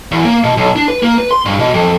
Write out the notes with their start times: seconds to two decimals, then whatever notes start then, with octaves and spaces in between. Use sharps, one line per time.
0.12 E2
0.25 A#3
0.44 B2
0.57 B1
0.76 D4
0.88 B4
1.03 A#3
1.18 B4
1.31 C6
1.46 G2
1.59 B2
1.74 F2